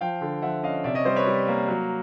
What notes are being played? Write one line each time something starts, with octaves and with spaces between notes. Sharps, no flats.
F3 F5 G5
D3
F3 E5 F#5
C#4 D#5 F5
C3 D5 E5
C#5 D#5
G3 C5 D5
B4 C#5
G3
A#3
F#3